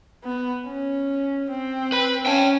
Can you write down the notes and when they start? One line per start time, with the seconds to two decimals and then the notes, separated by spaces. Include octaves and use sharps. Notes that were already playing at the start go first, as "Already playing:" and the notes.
0.24 B3
0.67 C#4
1.50 C4
1.92 B4 B5
2.26 C#4 G5 A5